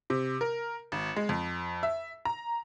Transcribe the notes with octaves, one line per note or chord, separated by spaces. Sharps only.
C3
A#4
G#1
G#3
F2
E5
A#5